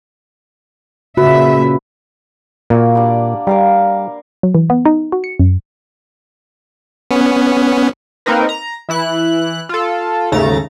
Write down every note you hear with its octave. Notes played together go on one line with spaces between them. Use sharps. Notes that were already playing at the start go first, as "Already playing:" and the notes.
A#2 C#3 F#4 B4 E5
A#2 A#3 F#4
G3 D4 D5
G3 A#4 F5 A#5
F#3
E3
B3
D#4
F#4
C#7
F#2
B3 C#4
A#3 C4 D#4 A#4 B4
A#5
E3 E4 F#6
F4 A4
D#2 G#2 C#3 A3 A#5 A6